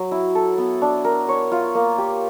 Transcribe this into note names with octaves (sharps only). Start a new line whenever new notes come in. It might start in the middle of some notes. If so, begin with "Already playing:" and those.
Already playing: F#3
E4
A4
B3
D4
A#4
C#5
F4
A#3
G4